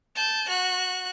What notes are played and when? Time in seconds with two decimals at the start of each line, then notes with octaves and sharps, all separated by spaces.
0.16 A5 G6
0.49 F#4 F#6